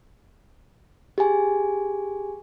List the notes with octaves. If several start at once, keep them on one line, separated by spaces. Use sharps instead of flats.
G4 G#4 G#5